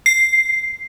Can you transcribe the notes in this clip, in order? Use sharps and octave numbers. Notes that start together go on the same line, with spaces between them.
C7